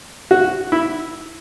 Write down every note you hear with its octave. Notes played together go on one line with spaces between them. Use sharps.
F#4
E4